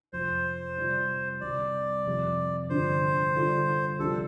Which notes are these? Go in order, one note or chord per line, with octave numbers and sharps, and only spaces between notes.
F1 F2 F3 C5
C3 G3 F4 D5
C2 C3 G3 D5
F1 F2 C3
G2 D3 F3 D4 C5
D3 G3 F4 A4 D5
C2 C3 F3 D4 G4 A4